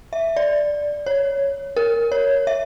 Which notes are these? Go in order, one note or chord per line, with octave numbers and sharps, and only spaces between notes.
E5
D5
C#5
A#4
C#5
E5